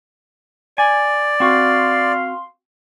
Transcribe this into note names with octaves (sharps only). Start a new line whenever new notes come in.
D5 G#5
C4 F#4 F5 C6